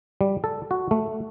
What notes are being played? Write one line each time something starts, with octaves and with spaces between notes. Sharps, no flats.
G3
A4
F#4
A3